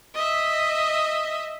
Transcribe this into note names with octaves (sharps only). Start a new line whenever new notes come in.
D#5 E5